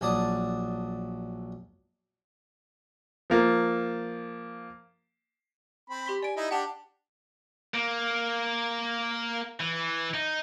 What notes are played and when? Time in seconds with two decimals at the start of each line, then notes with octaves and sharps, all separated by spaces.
0.01 A#1 F#3 D5 A5 D#6
3.30 F3 A#3
5.90 C4 B5
6.06 G4 C6 B6
6.23 D5 G#5 D7
6.37 D#4 E4 D#5
6.51 D4 G4 F#5 A5
7.74 A#3
9.60 E3
10.14 D#4